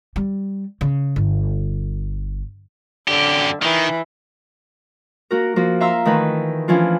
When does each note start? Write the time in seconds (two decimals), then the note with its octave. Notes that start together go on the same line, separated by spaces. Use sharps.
0.16 G3
0.81 C#3
1.16 G1
3.08 F#2 D3 G4
3.62 D#3 E3
5.31 A#3 F#4 A#4
5.56 F3 A#3 F#4
5.80 E5 F5 A#5 C6 E6
6.05 D#3 E3 A3 B4
6.68 E3 F3 C#4 D4 F4